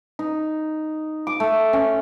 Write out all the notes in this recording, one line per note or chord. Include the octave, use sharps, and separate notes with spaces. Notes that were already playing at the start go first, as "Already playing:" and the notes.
D#4
D6
A3
C#4